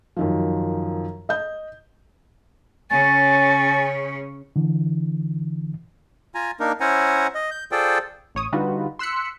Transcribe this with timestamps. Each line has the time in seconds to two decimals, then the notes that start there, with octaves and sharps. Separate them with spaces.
0.17 F#2 D#3 F3
1.29 D#5 G6
2.90 C#3 C#4 G#5 A6
4.56 D3 E3
6.35 F4 G#5 A#5
6.60 A#3 D4 D#4 A#4
6.80 C#4 E4 C5 F#5 G#5 A#5
7.35 D#5
7.51 G6
7.72 F4 G#4 A4 C5 D5 G5
8.35 A1 C#5 D#6
8.52 D3 G3 D#4 F4 F#4 B4
8.99 C6 E6 F#6 B6 C#7